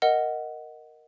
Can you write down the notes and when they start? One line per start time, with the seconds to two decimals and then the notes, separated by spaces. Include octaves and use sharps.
0.02 A#4 D#5 F#5